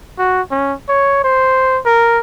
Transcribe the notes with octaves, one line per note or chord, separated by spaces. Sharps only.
F#4
C#4
C#5
C5
A#4